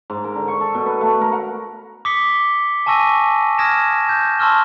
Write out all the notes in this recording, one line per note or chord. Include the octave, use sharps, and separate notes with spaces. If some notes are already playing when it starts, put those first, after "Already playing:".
G#2
A#4
D3
C#6
A4
B2
B4
A3
A#4
F#5
D6 D#6 B6 C#7 G7
G#5 A5 C#6 E6 A#6 D#7
D#6 F6 G#6 A#6 D7 E7
G6
A5 C6 C#6 E6 F6 G7